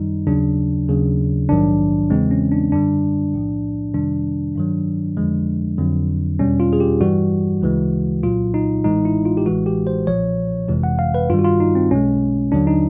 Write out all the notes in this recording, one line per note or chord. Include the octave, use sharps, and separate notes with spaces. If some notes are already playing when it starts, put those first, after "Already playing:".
Already playing: F#2 D#3 G3 D#4
D#2 C#3 F#3 D4
D#2 C#3 F#3
A#1 G#2 D#3 F#3 D4
E2 C#3 E3 G#3 C4
C#4
D4
F#2 D3 G3 D4
B1 A2 F3
F2 C3 D#3 G3 D4
G2 D#3 F#3
F2 D3 F3 G#3
F2 D3 F#3
E2 B2 G3 C#4
F4
G#4
G4
G2 E3 G3 F#4
D2 C#3 E3 G#3
C2 A#2 F#3 F4
D#4
A1 A2 E3 G#3 D#4
E4
F4
G4
A1 A2 E3 G#3 F#4
G4
C5
B1 A#2 F3 C#5
G1 F2 C3 E3 G#3
F#5
F5
B4
G2 D#3 G3 F4
F#4
F4
D#4
C4
B1 B2 G#3 C#4
D#2 D3 F#3 D4
D#4